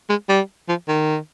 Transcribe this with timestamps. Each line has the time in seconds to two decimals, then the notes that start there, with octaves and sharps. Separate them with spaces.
0.10 G#3
0.29 G3
0.69 F3
0.88 D#3